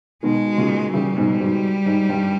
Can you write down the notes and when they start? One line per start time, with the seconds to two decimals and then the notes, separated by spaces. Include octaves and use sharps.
0.23 B2 D#3 G#3
0.58 A#2 C#3
0.93 C#3 E3 G3
1.16 G#2 B2
1.40 G#2
1.86 G#2
2.09 G2